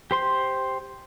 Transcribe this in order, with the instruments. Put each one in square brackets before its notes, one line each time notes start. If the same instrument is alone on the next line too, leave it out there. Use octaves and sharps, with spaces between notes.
[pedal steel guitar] G4 C5 C6